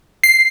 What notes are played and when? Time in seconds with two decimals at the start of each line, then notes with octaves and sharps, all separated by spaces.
0.24 C7